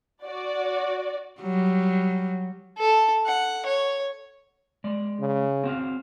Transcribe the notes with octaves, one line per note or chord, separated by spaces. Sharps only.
F#4 D5
F#3 G3
A4
F#5
C#5
G#3 D5
C#3
C4 F#4 F5